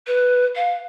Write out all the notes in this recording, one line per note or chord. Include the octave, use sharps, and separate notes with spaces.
B4
F5